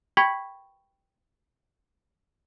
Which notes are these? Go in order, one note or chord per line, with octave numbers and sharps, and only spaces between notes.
G5 B5 C#6 G#6 B6 F#7